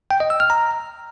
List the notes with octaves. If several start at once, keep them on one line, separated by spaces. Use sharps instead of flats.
G5
D#5
E6
F6
A#5